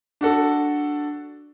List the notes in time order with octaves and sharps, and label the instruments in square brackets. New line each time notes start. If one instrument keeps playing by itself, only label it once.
[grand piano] D4 F#4 A4